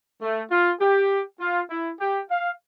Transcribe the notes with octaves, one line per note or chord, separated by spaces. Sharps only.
A3
F4
G4
F4
E4
G4
F5